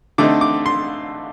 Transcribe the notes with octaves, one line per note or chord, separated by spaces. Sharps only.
D3 A3 C4 D#4 D6
D6
C6